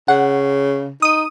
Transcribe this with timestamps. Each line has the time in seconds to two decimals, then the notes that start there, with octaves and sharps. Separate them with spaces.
0.08 C#3 F#5
1.02 D#4 D#6 D#7